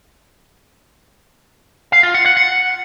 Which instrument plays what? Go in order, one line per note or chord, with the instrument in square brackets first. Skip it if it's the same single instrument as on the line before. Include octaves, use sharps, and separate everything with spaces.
[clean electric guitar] F5
F4
F#5
F#5
F#5